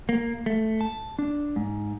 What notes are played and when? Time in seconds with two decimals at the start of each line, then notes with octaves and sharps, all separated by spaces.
0.09 A#3
0.46 A3
0.81 A5
1.19 D4
1.56 G#2